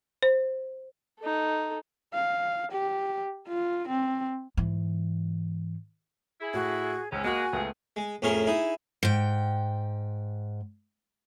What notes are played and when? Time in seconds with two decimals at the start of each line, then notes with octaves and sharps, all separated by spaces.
0.23 C5
1.19 D#4 A4
2.13 F5
2.72 G4
3.48 F4
3.88 C4
4.57 G#2 E3
6.41 E4 G#4
6.54 A2 F#4
7.12 C#2 G#2 C#4 G#5
7.24 G#3 A#3 F#4 F#6
7.53 C#2 D#3 F3 A3 B3 G#4
7.96 G#3
8.22 F2 A2 C#4 G#4 A#4 C6
8.47 D#4 E4 G#4
9.03 G#2 G5